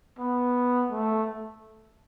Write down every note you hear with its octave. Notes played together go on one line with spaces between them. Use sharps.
B3
A3